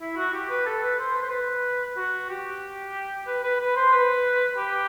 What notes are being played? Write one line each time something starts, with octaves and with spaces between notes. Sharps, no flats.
E4
F#4
G4
B4
A4
B4
C5
B4
C5
B4
F#4
G4
B4
B4
B4
C5
B4
G4